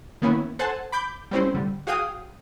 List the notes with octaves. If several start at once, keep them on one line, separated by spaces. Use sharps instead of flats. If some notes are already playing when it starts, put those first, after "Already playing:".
D#3 A#3 B3 C#4 E4
A4 C5 F#5 G#5 A5
B5 D6 G6
G3 A3 C4 C#4 E4 C5
D3 G3
F#4 G#4 F5 G5 D#6